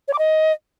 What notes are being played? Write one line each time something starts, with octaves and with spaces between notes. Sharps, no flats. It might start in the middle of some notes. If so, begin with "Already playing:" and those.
C#5
D6
D#5